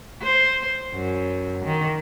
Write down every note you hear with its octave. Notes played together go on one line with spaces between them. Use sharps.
C5
F#2
D#3